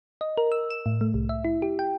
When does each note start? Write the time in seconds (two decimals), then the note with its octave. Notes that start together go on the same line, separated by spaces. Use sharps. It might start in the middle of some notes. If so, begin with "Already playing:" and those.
0.21 D#5
0.37 A#4
0.52 E6
0.70 E7
0.86 A2
1.01 A3
1.14 C2
1.29 E5
1.45 E4
1.62 G4
1.79 G5